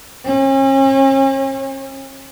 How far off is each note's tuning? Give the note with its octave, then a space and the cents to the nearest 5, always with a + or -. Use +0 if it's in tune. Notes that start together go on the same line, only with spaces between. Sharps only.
C#4 -40